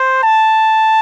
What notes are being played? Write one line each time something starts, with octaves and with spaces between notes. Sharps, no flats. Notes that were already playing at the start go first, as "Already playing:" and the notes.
Already playing: C5
A5